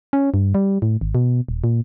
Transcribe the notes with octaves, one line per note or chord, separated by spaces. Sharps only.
C#4
G2
G3
A2
G#1
B2
D#1
A#2